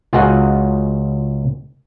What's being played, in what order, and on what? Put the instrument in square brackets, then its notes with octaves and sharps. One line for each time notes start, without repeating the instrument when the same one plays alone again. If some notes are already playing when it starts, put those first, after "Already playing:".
[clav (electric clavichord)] C#2 F4 F#4 G#4 D#5 F#5